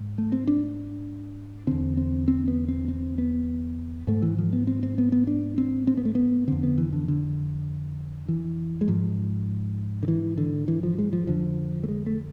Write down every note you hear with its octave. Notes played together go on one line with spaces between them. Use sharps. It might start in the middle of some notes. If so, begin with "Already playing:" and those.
Already playing: G#2
A3
C4
D4
E2 D3 C4
C4
C4
B3
C4
C4
B3
G#2 A3
E3
F3
B3
C4
C4
B3
B3
D4
C4
C4
B3
A3
B3
F2 D3 C4
B3
E3
D3
D3
E3
G#3
G#2 F3
D3
E3
D3
E3
F3
G#3
F3
F2 D3 F3
A3
G#3
A3